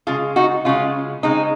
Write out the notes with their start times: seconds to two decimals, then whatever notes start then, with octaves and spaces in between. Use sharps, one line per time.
0.07 C#3 G#3 F4 G#4
0.36 D#4 F#4
0.65 C#3 G#3 C#4 F4
1.23 C#3 G#3 C4 D#4